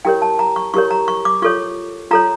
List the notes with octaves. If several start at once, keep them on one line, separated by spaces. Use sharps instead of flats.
E4 G4 A#4 C#5 G5
A5
A#5
C#6
E4 G4 A#4 C#5 C#6
A#5
C#6
D6
F4 A4 C#5 C#6
F4 A4 C#5 A#5